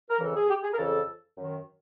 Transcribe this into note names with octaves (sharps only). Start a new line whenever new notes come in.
A#4
F2 C#3 E3 A4
G#4
G4
G#4
A#4
F2 C#3 E3 A4
F#2 D#3